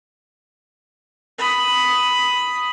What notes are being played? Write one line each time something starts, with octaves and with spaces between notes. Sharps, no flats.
B5 D#6